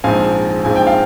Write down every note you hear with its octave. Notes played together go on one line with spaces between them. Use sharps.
A#1 G#2 F3 C4 F5 G#5
A#1 G#2 F3 C4 G#5
G5
F5